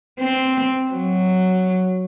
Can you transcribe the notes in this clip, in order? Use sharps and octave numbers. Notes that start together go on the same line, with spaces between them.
C4
F#3